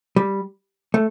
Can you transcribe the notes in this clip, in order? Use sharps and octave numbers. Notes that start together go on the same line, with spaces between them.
G3
A3